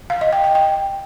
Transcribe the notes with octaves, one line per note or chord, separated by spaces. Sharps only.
F5
D#5
G5
G5
G5